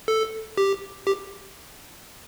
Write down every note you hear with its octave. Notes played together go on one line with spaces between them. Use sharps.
A4
G4
G4